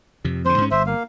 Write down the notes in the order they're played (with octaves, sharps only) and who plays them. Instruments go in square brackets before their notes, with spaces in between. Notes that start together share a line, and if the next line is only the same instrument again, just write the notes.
[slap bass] F2 C3
[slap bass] F2 D3 [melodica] C5
[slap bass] G#2 C#4
[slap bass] G1 [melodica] C5 E5
[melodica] A#3 F5